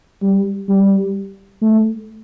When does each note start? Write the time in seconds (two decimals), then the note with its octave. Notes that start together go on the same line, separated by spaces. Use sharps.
0.22 G3
0.68 G3
1.62 A3